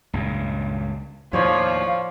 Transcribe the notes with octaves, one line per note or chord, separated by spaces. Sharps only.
C#2 G2 A#2
D#2 A2 F3 C#5 D5 F5 C#6